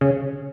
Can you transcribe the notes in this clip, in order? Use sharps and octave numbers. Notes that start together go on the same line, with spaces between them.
C#3